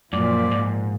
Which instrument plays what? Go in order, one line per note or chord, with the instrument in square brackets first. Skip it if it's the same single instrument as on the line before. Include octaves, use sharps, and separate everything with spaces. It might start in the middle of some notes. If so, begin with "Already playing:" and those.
[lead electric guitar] F#2 [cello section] A#2 F3 [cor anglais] D5
[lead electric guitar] G#2